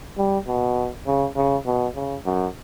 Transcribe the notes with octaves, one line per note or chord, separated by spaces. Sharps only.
G3
B2
C#3
C#3
B2
C#3
F#2